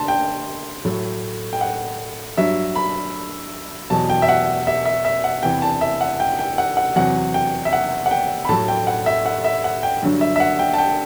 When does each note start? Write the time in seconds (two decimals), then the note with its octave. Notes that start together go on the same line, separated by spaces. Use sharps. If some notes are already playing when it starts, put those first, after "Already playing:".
Already playing: D3 A5 C6
0.08 G5
0.85 A2 F#3
1.53 G5
1.61 F#5
2.37 G2 F#3 E5
2.75 B5
3.90 E2 B2 F#3 A5
4.10 G5
4.22 E5
4.29 F#5
4.67 E5
4.86 E5
5.05 E5
5.24 F#5
5.43 E2 C3 E3 G5
5.62 A5
5.81 E5
6.01 F#5
6.20 G5
6.39 G5
6.58 F#5
6.77 F#5
6.96 E2 C3 F#3 F#5
7.34 G5
7.65 E5
7.73 F#5
8.06 F#5
8.11 G5
8.45 B5
8.49 A2 F#3 A5
8.68 G5
8.87 F#5
9.06 E5
9.26 F#5
9.44 E5
9.64 F#5
9.83 G5
10.03 G2 D3 F#3
10.21 E5
10.36 E5
10.40 F#5
10.59 G5
10.73 A5
10.78 G5